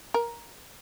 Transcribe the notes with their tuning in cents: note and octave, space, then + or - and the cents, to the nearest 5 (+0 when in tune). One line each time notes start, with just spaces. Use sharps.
A#4 +10